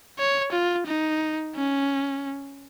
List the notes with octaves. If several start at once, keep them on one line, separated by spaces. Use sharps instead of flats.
C#5
F4
D#4
C#4